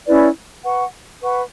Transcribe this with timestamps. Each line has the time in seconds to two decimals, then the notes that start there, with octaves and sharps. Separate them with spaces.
0.06 C#4 E4 B4 D5
0.63 B4 F#5 C#6
1.21 B4 F#5 C#6